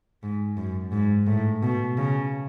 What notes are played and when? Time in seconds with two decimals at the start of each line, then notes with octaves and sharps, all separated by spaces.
0.23 G#2
0.57 F#2
0.92 G#2
1.27 A2
1.63 B2
1.98 C#3